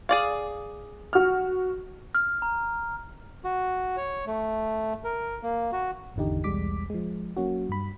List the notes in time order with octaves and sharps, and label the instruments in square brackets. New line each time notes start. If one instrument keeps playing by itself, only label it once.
[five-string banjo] G#4 D5 F5
[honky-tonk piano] F#4 F6
[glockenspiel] F6
A#5
[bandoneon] F#4
C#5
A3
A#4
A#3
F#4
[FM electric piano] G#1 E2 D3 D#4 G4
B1 E2 G3 G#3 D6 B6
F3 G#3
F#3 A#3 C#4 F#4
G2 B5